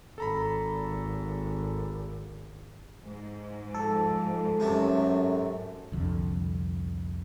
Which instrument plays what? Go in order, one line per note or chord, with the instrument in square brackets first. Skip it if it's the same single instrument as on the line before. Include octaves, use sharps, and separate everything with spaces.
[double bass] G#1 [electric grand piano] A4 A#5 B5
[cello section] G#2
[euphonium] F3 [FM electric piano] A4
[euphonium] F#2 [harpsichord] C3 A3
[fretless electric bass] C2 F2 D3